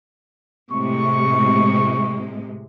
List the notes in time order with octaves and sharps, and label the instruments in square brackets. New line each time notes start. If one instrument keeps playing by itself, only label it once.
[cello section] A2 C3 G#3 [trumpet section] C#6